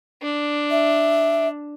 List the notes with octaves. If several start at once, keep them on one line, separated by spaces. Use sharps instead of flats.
D4
E5